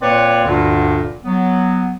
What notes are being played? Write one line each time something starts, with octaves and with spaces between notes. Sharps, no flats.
A#2 A#3 C4 B4 C#5 D5
D2 G2 A#2 D3
F#3 B3